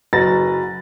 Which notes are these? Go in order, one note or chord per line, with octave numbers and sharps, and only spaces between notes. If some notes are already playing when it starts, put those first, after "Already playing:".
F#1 F#4 B4 A#5 A6 A#6